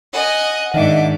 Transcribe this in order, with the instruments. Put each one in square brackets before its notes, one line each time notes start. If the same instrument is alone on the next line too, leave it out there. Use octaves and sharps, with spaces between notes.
[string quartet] D#5 [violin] F#5 G#5
[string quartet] G#2 [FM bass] D#3 [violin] D4 D6 [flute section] D#5 E5 F#5